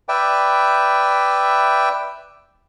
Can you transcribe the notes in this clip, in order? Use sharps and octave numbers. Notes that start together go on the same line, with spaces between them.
B4 D5 E5 G5